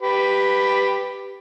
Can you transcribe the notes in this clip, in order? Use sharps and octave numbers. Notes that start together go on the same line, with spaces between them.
G4 B4